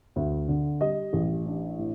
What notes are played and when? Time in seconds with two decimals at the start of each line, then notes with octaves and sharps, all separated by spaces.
0.16 D2
0.48 D3
0.81 G3 D#5
1.13 A1
1.46 D4
1.78 A2